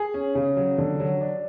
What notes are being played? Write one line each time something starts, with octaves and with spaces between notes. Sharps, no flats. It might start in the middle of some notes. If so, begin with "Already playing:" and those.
Already playing: G#4
C#4
C#3
F#3
D3
F#3
D4